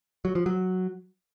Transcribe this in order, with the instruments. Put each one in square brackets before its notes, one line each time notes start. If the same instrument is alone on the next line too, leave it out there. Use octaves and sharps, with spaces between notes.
[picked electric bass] F#3
F3
F#3